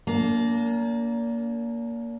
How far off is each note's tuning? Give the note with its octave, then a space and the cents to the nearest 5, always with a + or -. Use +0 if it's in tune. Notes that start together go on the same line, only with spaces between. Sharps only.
A#3 +0 D4 -40